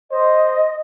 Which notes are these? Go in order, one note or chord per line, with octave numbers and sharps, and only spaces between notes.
C5 D#5